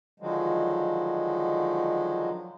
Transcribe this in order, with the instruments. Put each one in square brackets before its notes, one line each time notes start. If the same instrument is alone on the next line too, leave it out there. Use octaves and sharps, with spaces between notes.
[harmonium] D3 D#3 F3 F#3 G#3